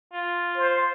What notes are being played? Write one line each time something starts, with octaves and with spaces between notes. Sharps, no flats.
F4
C5